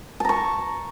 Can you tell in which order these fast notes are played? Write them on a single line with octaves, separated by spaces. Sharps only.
A5 A#5 C#6